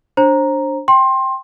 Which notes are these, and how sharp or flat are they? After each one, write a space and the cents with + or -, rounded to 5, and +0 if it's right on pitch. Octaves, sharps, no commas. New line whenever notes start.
D4 +0 C5 +30 A#5 +0
G5 +0 C6 +20